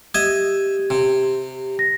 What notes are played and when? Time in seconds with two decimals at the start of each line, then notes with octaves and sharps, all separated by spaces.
0.14 G4 D#5 E5 G#6
0.90 C3
1.79 A#6